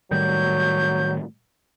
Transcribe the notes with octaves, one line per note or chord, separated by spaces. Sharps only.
A2 D#3 F#3 G3 G6